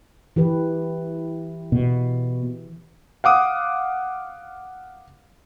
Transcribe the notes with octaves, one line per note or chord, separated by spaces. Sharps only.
E3 G4 B4
B2
F5 F#5 D6 D#6